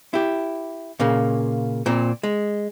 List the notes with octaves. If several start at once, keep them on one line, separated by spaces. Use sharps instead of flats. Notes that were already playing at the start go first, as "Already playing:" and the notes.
E4 G4
A#2 C#3 A#3
A#2 C4
G#3